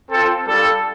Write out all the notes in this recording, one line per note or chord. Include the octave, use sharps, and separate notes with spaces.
C4 F4 A4
G3 D4 F4 A4